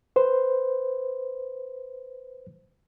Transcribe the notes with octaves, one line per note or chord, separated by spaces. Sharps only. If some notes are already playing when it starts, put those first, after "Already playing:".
B4 C5